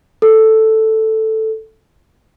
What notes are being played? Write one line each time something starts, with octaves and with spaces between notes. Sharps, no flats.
A4